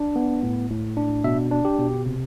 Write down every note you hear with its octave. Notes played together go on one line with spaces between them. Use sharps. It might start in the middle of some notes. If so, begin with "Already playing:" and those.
Already playing: D4
B3
A2
A2
D4
B2 E5
D4
G4
B2
C3